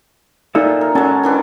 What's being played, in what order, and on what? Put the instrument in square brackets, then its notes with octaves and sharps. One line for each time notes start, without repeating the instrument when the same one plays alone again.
[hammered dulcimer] A#2 [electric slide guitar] D#4 A4 E5
[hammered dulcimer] A#4
[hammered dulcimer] F#3 G#3 [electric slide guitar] C#4 A4 A5
[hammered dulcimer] D#3 E3 D4